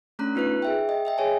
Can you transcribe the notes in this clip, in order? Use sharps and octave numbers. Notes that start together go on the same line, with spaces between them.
A3 C#4 D4 A#5 F#6
B3 D#4 F4 B4 F#6
G#4 E5 G5
D#5 G5
D#5 E5 G5
G#4 C#5 G#5